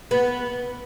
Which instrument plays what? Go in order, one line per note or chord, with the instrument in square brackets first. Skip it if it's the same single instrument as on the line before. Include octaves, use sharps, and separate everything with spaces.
[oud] B3